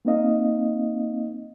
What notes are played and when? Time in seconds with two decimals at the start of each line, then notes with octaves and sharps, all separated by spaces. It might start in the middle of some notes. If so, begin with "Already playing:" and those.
0.05 A#3 C4 D#4 D#5 F5